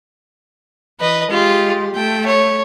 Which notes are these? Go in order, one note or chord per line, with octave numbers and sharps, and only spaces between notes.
E3 B4 D#5
G#3 F4 G4
A3 G5
C#5